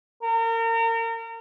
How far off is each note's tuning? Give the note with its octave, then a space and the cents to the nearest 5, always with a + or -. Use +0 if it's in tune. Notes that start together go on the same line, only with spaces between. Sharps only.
A#4 -35